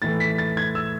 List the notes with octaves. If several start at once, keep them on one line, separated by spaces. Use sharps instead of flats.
A2 E3 A3 A6
B6
A6
G#6
E6